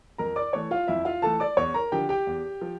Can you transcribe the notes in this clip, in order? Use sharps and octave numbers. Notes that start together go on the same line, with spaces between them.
F2 A#4 A#5
D5 D6
E3 A3 C#5 C#6
F4 F5
F2 E4 E5
F4 F5
E3 A3 A4 A5
D5 D6
E2 C#5 C#6
A#4 A#5
D3 F3 G4 G5
G4 G5
E2
F3